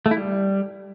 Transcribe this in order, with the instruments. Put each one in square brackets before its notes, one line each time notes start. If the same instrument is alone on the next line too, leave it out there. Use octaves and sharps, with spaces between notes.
[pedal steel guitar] A3
E4
G3